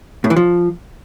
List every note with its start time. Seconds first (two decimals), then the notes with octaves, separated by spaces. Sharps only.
0.24 A2
0.30 E3
0.36 F3